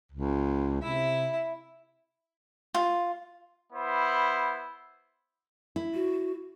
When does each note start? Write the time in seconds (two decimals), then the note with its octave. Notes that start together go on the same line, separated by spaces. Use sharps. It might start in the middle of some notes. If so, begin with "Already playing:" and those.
0.12 C#2
0.82 C3 E4 E5
2.74 F4
3.73 B3 E4 C5
5.76 E4
5.94 F#4